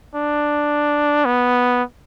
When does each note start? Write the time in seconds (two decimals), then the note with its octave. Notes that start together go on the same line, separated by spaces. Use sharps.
0.15 D4
1.25 B3